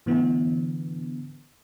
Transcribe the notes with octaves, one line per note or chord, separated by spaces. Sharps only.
A2 D3 E3 B3